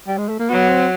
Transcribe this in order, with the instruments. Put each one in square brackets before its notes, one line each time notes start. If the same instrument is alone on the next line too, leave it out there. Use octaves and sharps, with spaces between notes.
[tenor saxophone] G3
G#3
A3
A#3
[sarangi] F#3 [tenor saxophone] B3
[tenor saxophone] C4